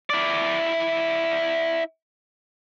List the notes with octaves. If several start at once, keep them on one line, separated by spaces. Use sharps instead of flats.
E4 D5